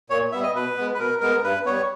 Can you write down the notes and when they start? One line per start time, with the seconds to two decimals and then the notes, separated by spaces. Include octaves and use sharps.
0.10 A#2 C#5
0.32 G3 B3 E5
0.43 D#5
0.55 B2 B4
0.77 G#3 B3
0.94 B4
0.99 B2 A#4
1.21 G#3 B3 A#4
1.43 G2 B4
1.65 G3 B3 C#5